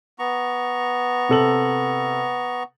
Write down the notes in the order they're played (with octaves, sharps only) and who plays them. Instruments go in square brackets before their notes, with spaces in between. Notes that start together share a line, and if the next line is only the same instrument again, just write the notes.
[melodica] B3 A#5 C#6
[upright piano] C3 A4 F#7